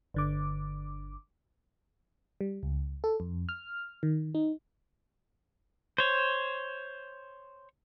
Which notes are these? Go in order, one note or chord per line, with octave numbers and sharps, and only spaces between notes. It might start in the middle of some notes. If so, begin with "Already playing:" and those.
G1 D3 D6
G3
C#2
A4
F2
F6
D#3
D#4
C5 C#5